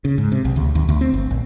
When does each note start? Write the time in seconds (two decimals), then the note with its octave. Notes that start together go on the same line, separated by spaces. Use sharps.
0.05 C#3
0.18 G#2
0.32 C3
0.45 B1
0.56 D2
0.75 D#2
0.89 D2
1.01 C4
1.14 G1
1.31 A#1